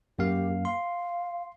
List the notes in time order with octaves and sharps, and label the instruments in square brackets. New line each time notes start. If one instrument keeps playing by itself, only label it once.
[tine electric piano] F#2 A#3 F5 [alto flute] G4
[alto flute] F5 [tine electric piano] C6